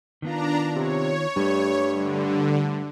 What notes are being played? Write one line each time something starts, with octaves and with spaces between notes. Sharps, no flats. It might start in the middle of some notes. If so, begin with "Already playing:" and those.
D#3 B3 D4 F4 A#5
C3 C#5
G2 G3 A3
D3